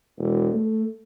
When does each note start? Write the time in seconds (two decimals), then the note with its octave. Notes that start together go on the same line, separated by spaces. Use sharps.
0.18 E1
0.54 A3